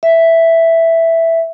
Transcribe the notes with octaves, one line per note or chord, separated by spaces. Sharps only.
E5